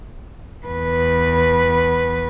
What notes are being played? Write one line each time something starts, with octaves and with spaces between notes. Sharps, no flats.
E2 B4